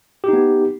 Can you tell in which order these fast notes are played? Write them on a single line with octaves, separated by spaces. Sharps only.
G4 D#4 B3